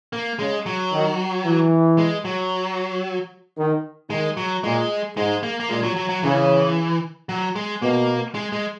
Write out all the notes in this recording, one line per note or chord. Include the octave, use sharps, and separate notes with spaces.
A#3
C#3 G#3
F#3
D#3
E3
G#3
F#3
D#3
D#3 G#3
F#3
A#2 G#3
G#2 G#3
A#3
A#3
A#2 G#3
F#3
F#3
F#3
C#3 E3
F#3
G#3
B2 A#3
G#3
G#3